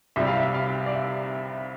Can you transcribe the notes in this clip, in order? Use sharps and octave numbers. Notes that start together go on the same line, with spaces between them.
C2 C3 G3 E5
F5
E5
F5
D5
E5